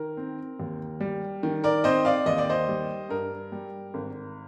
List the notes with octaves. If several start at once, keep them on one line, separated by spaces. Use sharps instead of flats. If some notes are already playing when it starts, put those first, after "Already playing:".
Already playing: D#3 A#4
C4
D#2
G3
D#3
A#4 D5
C4 C5 D#5
D5 F5
D#2 D#5
D5
C5 D#5
G3
G2 A#4
G3
G#1